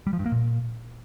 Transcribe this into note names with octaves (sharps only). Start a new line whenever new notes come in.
G3
F3
G2
A#3
A#2